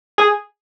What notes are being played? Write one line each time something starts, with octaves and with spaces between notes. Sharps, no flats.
G#4